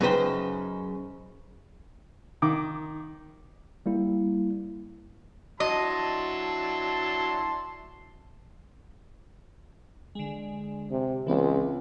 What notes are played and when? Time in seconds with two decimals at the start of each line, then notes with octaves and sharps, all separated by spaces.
0.01 F#2 C#3 D#4 B4 C5 G5
2.42 D#3 D6
3.86 G3 A#3 E4
5.60 F#3 D4 E4 D#5 A5 C6
10.15 D3 G#3
10.91 C3
11.27 C#2 E3 B3 C4